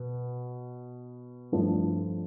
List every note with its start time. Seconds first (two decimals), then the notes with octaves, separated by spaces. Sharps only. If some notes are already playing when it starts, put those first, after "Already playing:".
Already playing: B2
1.52 G2 F3 A3 D4